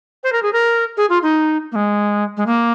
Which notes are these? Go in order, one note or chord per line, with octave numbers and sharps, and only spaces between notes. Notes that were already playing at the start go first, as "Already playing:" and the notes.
C5
A#4
G#4
A#4
G#4
F4
D#4
A#3
G#3
G#3
A#3